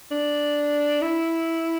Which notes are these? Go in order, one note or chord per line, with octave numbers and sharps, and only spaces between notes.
D4
E4